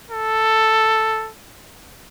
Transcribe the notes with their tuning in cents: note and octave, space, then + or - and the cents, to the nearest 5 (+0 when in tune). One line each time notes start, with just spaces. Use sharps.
A4 +5